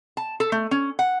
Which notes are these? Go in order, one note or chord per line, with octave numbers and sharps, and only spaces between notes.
A5
A4
A3
C#4
F#5